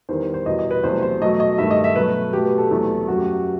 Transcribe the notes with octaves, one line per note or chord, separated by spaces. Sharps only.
E2 D#3 G3 C5
C5
E2 B2 G3 D#5
D#5
B4
E2 C3 F#3 A3 C5
C5
B2 F#3 A3 D#5
D#5
G2 D#3 A3 E5
D#5
E5
B2 F#3 A3 B4
B2 A3 G4
B4
A4
E2 C3 F#3 A3
F#2 F#3 A3 F#4
G4
F#4